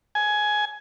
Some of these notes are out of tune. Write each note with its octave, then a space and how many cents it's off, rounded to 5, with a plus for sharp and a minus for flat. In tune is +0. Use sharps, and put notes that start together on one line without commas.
G#5 +15